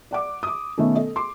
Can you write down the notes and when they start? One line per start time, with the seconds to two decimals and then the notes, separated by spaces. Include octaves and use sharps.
0.11 D5 F#5 D6
0.43 D6 D#6
0.78 B2 D#3 A3 B3 C#4
0.95 A4 D#5
1.16 C6 D6